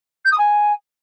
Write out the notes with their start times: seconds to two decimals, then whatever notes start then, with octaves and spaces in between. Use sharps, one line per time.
0.25 G6
0.31 D#6
0.38 G#5